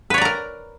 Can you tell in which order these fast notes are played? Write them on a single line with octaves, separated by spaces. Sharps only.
B4 C#5 D5 A#5 A#4